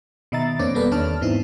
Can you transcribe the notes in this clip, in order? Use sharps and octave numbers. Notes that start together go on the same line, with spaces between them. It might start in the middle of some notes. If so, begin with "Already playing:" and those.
B2 D#3 D#5 E5 A#5 A6
F2 A#3 C4 D4 C#5 D6
G3 A#3 B3 A4 B4 D5
E2 D#3 D4 C#5 A5 F6
G#2 E3 B3 C4 D#4 E4